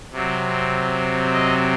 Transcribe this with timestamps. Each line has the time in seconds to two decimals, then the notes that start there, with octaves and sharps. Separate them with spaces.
0.12 C3 F#3 C4
1.33 D#5